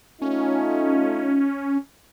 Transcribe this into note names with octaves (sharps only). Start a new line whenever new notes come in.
A3 C#4 D#4 F4